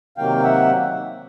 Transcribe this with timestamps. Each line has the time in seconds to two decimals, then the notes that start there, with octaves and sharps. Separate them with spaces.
0.17 C3 D#3 F#3 A#3 F5 G5
0.37 F5
0.44 E5 F#5